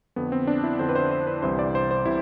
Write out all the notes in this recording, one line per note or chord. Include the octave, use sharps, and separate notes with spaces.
F2 D3 B3
C4
D4
E4
F2 D3 C5
B4
C5
C5
B4
C2 C3 E3 C5
D5
C5
C5
C3 E3 E4